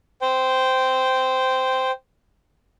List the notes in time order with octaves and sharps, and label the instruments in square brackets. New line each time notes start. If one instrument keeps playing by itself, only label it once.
[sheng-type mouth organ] C5 G5